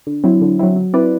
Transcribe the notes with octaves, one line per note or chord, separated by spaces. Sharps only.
D3
F#3 C4 E4
D3
F#3 C4 E4
F#3
C4 E4 B4 D5